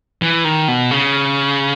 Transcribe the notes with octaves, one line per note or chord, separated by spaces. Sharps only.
E3
D#3
B2
C#3